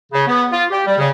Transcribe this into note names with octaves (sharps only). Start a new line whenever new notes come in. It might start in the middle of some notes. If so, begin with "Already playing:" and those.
C#3
B3
F4
G4
G3
C#3